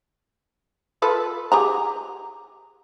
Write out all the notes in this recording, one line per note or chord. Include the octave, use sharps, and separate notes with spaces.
F4 A4 B4
G4 G#4 A#5